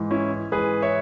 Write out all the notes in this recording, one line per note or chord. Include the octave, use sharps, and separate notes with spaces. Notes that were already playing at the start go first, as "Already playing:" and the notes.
Already playing: G#2 E3
C#4 E4
G#2 E3 G#4 B4
C#5 E5